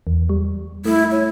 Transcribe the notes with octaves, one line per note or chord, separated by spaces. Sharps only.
E2
G3
A3 E4
C#5